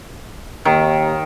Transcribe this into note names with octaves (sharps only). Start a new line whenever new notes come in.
D#2 D#3